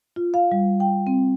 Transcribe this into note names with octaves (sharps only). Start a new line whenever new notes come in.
F4
F5
G3
G5
C4